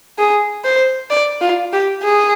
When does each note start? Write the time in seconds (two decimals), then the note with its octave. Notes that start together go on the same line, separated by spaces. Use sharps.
0.19 G#4
0.64 C5
1.10 D5
1.41 F4
1.73 G4
2.03 G#4